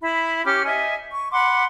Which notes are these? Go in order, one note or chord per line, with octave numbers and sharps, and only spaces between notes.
E4 B5
C#4 G4 D6 F6
D#5 E5 G#5
C#6
F#5 B5 C6 D6